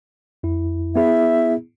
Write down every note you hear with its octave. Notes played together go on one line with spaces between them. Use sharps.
F2 E4
B3 E4 G#4 E5